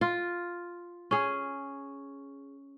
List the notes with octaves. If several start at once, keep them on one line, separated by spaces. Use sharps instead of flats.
F4
C#4 G#4